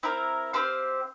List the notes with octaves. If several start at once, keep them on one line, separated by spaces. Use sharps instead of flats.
C4 E4 A#4
C4 G4 C5 F5